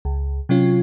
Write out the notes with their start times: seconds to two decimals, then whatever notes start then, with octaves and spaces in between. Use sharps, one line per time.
0.05 C#2
0.49 C3 F#3 C#4 F4